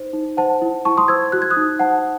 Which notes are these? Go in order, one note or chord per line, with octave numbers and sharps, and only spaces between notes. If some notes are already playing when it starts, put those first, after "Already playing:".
Already playing: D#4 C5
D#4
C5 F#5 A5
E4
E4 A5 C#6
C6 D#6
C5 E6 G#6
F#4 F#6
G#6
D#6 F#6
D#4
C5 F#5 A5